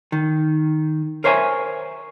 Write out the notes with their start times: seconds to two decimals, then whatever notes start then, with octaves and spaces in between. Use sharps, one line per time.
0.12 D#3
1.24 A#4 C5 C#5 E5 G#5